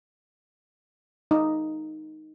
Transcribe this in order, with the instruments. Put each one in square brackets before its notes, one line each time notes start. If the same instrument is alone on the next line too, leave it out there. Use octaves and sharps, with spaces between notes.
[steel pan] D#4